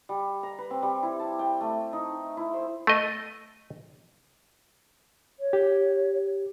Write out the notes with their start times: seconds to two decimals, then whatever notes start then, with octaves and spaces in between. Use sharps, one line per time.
0.09 G3
0.43 A#5
0.58 B4
0.71 C4
0.83 G3
1.03 E4
1.19 A5
1.39 G5
1.61 A3
1.93 D#4
2.37 E4
2.54 C5
2.87 A3 D#5
5.40 C#5
5.53 G4